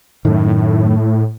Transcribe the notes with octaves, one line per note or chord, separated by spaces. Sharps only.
F#2 A2 D#3